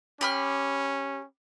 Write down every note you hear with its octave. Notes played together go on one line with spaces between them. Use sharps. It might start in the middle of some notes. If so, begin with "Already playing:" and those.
C#4 G4 B5 F6